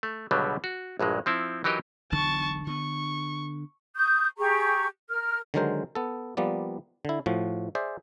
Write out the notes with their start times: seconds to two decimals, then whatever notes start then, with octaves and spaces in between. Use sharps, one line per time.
0.03 A3
0.31 C#2 B2 D3 F#3 G3 B3
0.64 F#4
0.99 A#1 G2 F#3 G#3
1.26 F3 C4 E4
1.64 E3 F#3 D#4 G4 A#4 D#5
2.12 E1 B1 D3 A5 C#6
2.67 D3 B3 C#6
3.96 C#6 D#6 G6
4.38 G4 G#4 A#5 C#6
5.09 A#4 F6
5.54 D3 D#3 F#3 G#3 A#4 C5
5.95 B3 A4
6.37 F3 G3 A#3 B3 D5
7.05 D3 E4
7.26 A2 F3 F#4
7.75 G#4 C5 D5 E5